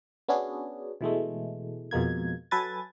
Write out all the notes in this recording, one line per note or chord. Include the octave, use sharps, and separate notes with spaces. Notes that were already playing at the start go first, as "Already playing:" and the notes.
B3 C#4 D4 F#4 G#4
B2 E3 G#3 A3
F2 B2 G#3 A#3 G#6
F#3 A4 B4 G#5 G#6 A6